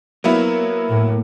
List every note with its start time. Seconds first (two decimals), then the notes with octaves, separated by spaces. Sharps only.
0.24 F#3 A#3 B3 E4
0.88 A2